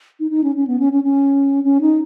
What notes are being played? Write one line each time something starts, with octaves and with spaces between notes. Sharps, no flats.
D#4
D#4
C#4
C#4
B3
C#4
C#4
C#4
C#4
D#4